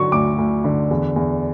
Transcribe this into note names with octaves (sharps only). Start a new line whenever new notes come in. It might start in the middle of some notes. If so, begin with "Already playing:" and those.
Already playing: D3 F#3 C#6
D2 D6
D2
D3
E2
E2